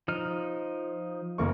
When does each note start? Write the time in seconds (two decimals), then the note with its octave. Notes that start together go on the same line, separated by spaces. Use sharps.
0.08 F3 D#4 F6
1.38 F#1 A#3 C#6